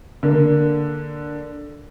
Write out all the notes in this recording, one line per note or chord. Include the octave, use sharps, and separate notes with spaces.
D3 A#3